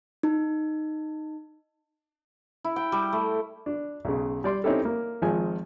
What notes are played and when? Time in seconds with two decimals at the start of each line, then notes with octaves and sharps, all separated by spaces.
0.23 D#4
2.64 E4
2.76 G5
2.92 G3
3.13 A3
3.66 D4
4.05 B1 C#3
4.44 G3 D5 C6
4.64 C4 C#4 D#4 E4 G4 A4
4.85 A#3
5.22 G#1 F3 G#3 G#5